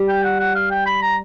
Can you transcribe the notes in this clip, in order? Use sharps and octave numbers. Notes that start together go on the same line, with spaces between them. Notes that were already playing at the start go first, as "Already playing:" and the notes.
Already playing: G3
G5
F#5
F#5
F5
G5
B5
A#5